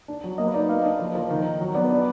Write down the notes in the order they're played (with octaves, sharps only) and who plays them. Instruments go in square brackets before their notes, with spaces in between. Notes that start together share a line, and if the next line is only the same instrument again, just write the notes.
[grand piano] D4
F#3
[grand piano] A#3 [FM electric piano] D#5
[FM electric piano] B4
[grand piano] D#4 [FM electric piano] D5
[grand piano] A#3 [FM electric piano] F5
[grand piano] D4 [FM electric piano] D#5
[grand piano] F3
F3
D#3
D#4
F#3
[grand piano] B3 [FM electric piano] D5
[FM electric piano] B4
[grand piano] D4 [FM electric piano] D5